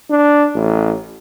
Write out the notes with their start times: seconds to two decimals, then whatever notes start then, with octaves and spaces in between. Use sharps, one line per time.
0.10 D4
0.55 A1